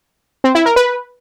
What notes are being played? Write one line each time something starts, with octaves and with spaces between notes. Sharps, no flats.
C4
E4
A#4
B4